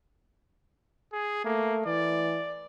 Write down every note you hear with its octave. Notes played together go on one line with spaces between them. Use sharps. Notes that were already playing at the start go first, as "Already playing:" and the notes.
G#4
A3 A#3
E3 D5